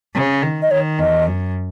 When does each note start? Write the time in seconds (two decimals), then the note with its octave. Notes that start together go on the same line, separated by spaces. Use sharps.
0.14 C#3
0.42 D#3
0.62 D#5
0.71 D#3 C#5
0.99 E2 D#5
1.27 F#2